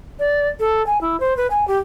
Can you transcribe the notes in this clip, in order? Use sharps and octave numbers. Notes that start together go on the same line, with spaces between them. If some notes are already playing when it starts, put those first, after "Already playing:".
D5
A4
G#5
E4
C5
B4
G#5
G4